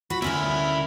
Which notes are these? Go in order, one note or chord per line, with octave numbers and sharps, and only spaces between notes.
F#4 B5
D2 C#4 E4 A#4 E5 B5